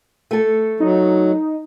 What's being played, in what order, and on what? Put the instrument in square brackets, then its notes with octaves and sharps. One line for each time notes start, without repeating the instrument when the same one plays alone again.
[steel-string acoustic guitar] A3 A4
[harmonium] F#3 [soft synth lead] D#4